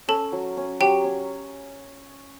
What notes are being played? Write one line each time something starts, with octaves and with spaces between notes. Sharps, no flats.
C#4 A4 A5
F#3
C#4
F#3 G4 G5
C#4